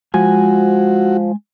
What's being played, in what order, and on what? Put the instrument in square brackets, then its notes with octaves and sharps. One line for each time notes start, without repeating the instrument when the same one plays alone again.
[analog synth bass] F3 [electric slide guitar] G#3 G#5 [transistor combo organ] F#4